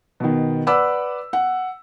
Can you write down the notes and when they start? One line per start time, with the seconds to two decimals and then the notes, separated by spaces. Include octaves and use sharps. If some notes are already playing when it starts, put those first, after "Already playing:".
0.20 B2 D#3
0.67 B4 D5 F#5 B5 D6 E6
1.33 F#5